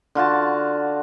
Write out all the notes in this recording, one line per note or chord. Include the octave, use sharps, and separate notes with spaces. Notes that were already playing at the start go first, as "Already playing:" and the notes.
D3 F4 F#4 A5